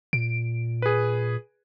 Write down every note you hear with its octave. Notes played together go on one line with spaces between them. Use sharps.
A#2 D7
G#4 B4